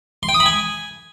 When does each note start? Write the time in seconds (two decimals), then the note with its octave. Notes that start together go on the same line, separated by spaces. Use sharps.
0.23 C6
0.29 G5
0.34 D#6
0.40 B5
0.46 G#5